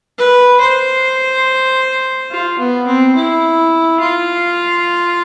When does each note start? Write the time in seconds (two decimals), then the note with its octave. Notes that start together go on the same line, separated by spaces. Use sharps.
0.18 B4
0.60 C5
2.30 F4
2.59 B3
2.87 C4
3.16 E4
4.00 F4